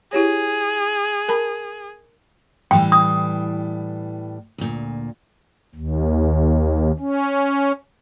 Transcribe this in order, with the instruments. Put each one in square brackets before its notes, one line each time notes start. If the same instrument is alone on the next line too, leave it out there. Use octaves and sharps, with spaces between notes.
[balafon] E4 G4 C#5 [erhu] G#4
[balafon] A#4 A5 B5
[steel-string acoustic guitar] A2 E3 G3 [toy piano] G5
[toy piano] D#6
[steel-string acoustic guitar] D2 A#2
[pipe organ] D#2
C#4